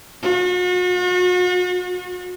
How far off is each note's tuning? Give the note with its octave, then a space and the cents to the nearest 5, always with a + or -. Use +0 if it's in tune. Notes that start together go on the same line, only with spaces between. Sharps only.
F#4 -40